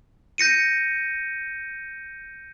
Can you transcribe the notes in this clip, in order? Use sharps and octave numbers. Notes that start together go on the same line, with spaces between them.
G6 A#6 C#7 D#7